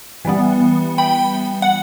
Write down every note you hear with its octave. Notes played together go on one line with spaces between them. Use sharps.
E3 G3 B3
G5 B5
F#5